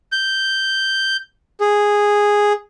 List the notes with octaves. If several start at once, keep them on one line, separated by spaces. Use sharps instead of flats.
G6
G#4